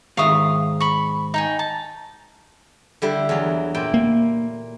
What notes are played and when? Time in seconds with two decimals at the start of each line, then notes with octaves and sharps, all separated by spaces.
0.17 G#2 D#3 E5 F5 C#6 D#6
0.80 B5 C#6
1.34 D#4 G5 G#5
1.59 A5
3.02 D3 G3 E4
3.29 E2 F#3 A#5
3.75 A#2 E4 G5
3.94 A#3